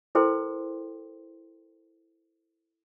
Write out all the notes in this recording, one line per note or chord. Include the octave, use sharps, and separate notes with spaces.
E4 A4 A#4 C5 G5 C6